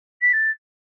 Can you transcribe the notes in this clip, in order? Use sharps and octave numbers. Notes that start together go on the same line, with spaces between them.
B6
A6